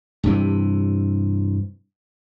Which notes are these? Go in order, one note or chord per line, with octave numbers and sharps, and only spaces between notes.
G2 C3 E3